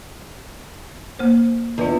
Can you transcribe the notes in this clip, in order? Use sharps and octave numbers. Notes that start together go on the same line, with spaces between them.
A#3 C5
E2 D4 F4 B4 D#5